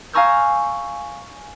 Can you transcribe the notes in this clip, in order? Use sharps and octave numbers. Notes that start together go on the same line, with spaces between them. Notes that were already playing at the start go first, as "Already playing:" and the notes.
F5 G#5 A#5 C#6 E6 G6